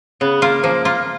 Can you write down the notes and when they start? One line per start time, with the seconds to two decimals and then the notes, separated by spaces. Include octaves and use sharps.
0.21 C#3 B3
0.42 A#3 F4
0.63 F3 A#3
0.85 A#3 F4